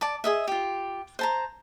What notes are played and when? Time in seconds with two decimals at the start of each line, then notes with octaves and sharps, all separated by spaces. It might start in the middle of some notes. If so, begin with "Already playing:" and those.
0.01 D5 A5 D6
0.24 G#4 D#5 E5
0.48 F4 G4
1.19 C5 A5 A#5